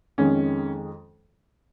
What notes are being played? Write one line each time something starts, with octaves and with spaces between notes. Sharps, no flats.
F2 D#3 G#3 C#4